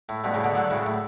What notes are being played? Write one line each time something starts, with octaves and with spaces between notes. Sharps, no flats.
A2
G2 B2
A2 C#3
B2 D3
D3 F#3
A2 C#3
A2